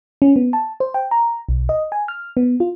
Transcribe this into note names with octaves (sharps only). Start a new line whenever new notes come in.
C#4
B3
A5
C5
G5
A#5
B1
D#5
G#5
F6
B3
F4